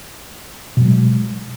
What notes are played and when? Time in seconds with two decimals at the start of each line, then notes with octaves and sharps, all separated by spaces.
0.77 B2
0.81 F#3
0.86 G#3